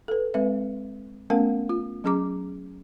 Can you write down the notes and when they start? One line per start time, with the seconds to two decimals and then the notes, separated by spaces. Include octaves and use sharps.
0.08 A4 B4
0.34 G#3 C4 B4 E5
1.30 A3 B3 C#4 A#4 F5
1.69 F4
2.04 F#3 C#4 G#4 A#5 D6